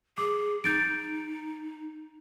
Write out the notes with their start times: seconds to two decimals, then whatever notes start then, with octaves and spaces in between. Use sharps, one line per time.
0.18 G#4 D6
0.64 D#4 G6 A6 D7